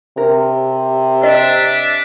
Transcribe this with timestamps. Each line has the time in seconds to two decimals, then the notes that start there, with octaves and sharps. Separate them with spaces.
0.18 C3 A#4
1.23 D4 D#5 E5